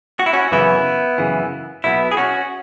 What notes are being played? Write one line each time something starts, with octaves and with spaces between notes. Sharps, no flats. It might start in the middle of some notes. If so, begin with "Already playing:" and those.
F#4
E4
C#4 F#4
F#2 C#3 E3 B3 E4
F#2 C#3 E3
B1 B2 B3 E4
G#4
C#4 F#4